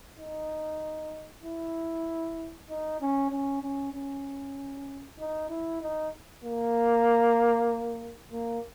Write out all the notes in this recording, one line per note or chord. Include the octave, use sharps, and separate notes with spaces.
D#4
E4
D#4
C#4
C#4
C#4
C#4
D#4
E4
D#4
A#3
A#3